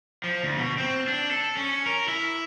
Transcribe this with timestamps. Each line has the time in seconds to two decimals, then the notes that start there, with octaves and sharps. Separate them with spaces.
0.24 F3
0.43 D2
0.57 B2
0.78 C4
1.08 D4
1.31 A4
1.57 C#4
1.86 A#4
2.08 E4